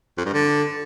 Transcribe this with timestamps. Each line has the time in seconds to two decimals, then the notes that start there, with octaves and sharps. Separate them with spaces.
0.18 F2
0.25 G2
0.33 D3